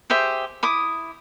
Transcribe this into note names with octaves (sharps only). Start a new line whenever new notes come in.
G4 G#4 C5 E5
E4 D6 D#6